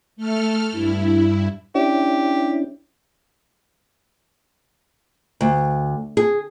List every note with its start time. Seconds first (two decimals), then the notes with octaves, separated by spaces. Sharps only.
0.16 A3 A4 F6
0.71 G2 E4
1.75 C#4 D4 E4 G4
5.41 D2
6.17 G#4